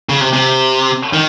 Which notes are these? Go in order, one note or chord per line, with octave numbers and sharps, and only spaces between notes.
C#3
C3
C3
D#3